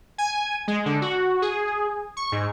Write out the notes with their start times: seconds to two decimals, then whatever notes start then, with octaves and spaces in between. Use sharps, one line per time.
0.18 G#5
0.68 G#3
0.86 D3
1.02 F#4
1.42 G#4
2.17 C#6
2.32 G#2